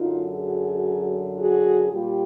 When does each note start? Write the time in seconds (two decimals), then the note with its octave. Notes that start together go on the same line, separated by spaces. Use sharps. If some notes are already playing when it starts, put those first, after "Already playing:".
Already playing: F#2 D3 F#3 D#4 F4
0.32 F#4 G#4
1.38 F#4 G#4
1.91 A#2 G3 F4 G4